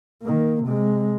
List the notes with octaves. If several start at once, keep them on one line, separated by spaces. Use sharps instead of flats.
D#3 A#3
C3 G#3